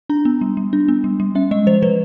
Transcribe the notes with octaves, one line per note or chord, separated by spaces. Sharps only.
D4 A#5
B3
G3
G3
D4
B3
G3
G3
C#4 E5
G#3 D#5
F3 C5
F3 B4